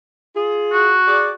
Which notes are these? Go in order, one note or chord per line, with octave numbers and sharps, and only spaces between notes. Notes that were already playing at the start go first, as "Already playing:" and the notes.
F4 G#4
F#4
G#4 D5